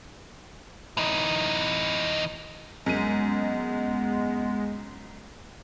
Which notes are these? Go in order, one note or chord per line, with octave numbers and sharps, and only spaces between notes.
E3 D#4
F#2 G#3 B3 D#7